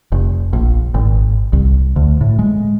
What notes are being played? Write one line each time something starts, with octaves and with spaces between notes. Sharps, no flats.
F1
A#1
G#1
C2
D2
A2
G#3